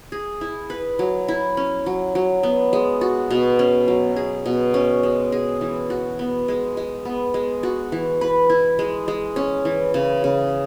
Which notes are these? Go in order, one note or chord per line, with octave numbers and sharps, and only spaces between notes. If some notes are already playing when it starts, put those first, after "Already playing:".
G#4
E4
B4
F#3
E4
C#4
F#3
F#3
B3
G#3
F#4
B2
C#4
F#3
G#4
B2
C#4
G#3
G#4
E3
F#4
B3
G#3
G#3
B3
G#3
F#4
E3
B4
E4
G#3
G#3
C#4
E3
C#3
C#3